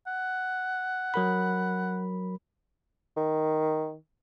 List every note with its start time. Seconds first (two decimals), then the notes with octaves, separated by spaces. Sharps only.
0.07 F#5
1.14 F#3 A#4 B5
3.17 D#3